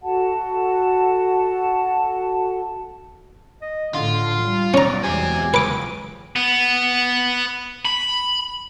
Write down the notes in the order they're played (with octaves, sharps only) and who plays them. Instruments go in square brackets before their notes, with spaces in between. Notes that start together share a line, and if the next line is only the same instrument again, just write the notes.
[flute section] F#4 A4 F#5 A5
[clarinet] D#5
[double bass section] A2 D3 [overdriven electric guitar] F4 [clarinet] C6
[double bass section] G3
[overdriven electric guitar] B1 [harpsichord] C#4 A#5 [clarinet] D5
[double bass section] E2 F#3 G#3 [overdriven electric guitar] C4 G4 [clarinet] G#5
[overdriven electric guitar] C#2 [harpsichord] B4 D6
[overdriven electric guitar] B3
B5